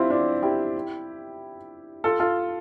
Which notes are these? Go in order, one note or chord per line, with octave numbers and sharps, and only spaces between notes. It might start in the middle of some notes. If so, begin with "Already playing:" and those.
Already playing: C4 D4 E4 F4 G4
D4 F4
E4 G4
F4 A4
F4 A4